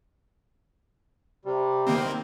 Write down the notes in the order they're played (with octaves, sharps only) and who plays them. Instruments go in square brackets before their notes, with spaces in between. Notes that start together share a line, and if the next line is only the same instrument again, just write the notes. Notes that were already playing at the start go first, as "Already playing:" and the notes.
[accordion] C3 G3
[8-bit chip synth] D#3 A#3 C4